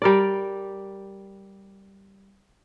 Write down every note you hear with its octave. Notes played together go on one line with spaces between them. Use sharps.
G3 A#4 D5